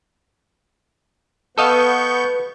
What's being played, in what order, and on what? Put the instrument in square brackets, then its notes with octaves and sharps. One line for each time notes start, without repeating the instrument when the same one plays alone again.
[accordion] B3 C#6 G6 [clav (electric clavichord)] A4 D#5 F5 [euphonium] B4